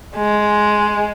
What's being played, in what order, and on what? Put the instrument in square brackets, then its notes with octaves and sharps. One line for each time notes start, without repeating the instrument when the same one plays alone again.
[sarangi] G#3